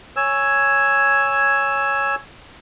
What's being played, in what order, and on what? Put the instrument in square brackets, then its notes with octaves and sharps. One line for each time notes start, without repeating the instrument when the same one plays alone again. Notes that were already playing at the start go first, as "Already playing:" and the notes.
[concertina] C#5 G#5 E6